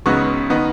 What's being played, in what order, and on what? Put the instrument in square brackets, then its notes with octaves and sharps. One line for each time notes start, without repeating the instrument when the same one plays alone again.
[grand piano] C#2 C#3 F#3 B3 D#4 C#6
D#3 B3 D#4